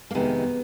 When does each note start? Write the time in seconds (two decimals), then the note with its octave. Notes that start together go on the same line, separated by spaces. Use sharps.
0.11 A#3
0.14 F2 C3 D#3 G#3 B3